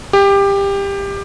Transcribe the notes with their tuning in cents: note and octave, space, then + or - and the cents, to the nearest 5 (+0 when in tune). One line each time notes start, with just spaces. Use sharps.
G4 +20